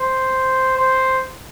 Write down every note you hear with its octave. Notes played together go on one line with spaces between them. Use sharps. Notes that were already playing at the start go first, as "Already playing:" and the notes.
Already playing: C5
C5